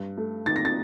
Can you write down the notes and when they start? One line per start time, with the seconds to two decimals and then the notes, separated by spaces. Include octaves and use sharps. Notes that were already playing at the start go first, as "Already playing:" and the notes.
Already playing: G2
0.17 A3
0.46 D#3 A6
0.56 A#6
0.65 A6